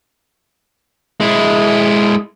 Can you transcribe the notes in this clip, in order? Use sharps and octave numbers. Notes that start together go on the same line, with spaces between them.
G#3 E4